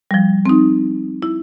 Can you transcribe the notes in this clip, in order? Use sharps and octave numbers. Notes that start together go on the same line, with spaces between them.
F3 G3
C4 D#4
E4